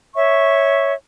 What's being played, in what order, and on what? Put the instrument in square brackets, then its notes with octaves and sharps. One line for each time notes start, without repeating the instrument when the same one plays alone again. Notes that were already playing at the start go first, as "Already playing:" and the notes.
[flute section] C#5 E5 C#6